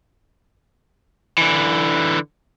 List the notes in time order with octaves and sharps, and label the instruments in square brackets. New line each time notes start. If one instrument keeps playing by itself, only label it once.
[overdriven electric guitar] D3 E3